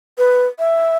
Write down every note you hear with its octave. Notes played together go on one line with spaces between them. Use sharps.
B4
E5